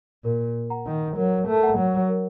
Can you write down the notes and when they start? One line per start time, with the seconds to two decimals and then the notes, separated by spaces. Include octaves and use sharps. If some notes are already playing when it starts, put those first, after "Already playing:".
0.24 A#2 A#4
0.70 F#5 A#5
0.86 D#3
1.17 F#3 A#4
1.48 A3
1.63 F#5 A#5
1.78 F#3
2.09 A#4